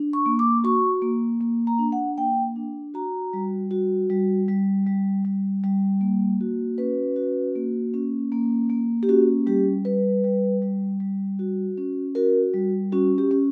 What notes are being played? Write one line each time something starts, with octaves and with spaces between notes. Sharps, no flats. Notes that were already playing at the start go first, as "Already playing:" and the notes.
Already playing: D4
C#6
A#3
D6
F#4 C#6
A#3
A#3
A#5
D4
F#5
A#3 G5
D4
F#4 A#5
G3
F#4
G3
G3
G3
G3
G3
A#3
F#4
C#4 B4
F#4
A#3
C#4
A#3
A#3
G4
C#4 F#4
G3 G4
G3 B4
G3
G3
G3
F#4
C#4
F#4 A#4
G3
C#4 F#4
G4
C#4